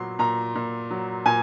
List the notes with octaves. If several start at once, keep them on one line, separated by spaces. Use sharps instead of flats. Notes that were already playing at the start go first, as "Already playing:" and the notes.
Already playing: A#2 F#3 B3 C6
A#2 A#5
A#2
F#3
A#2 G#5